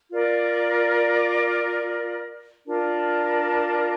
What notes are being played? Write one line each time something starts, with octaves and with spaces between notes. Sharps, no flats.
F4 A#4 D5
D4 F4 A#4 D5